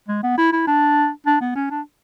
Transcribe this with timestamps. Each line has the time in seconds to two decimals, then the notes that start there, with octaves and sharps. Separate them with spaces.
0.08 G#3
0.23 B3
0.38 E4
0.53 E4
0.67 D4
1.26 D4
1.41 B3
1.55 C#4
1.71 D4